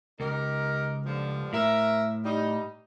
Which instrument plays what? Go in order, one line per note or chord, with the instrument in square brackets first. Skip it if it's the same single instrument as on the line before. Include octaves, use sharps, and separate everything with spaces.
[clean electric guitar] C#2 [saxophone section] D#4 G4 A#4
[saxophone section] G2 D3 F3
[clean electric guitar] A2 [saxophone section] A#4 E5
[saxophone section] G3 D#4